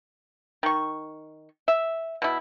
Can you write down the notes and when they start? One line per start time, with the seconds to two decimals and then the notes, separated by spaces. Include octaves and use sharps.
0.63 D#3 C#6
1.68 E5
2.22 B2 E4